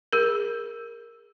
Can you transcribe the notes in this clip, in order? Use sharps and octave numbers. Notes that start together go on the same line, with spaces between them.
G#4 A#4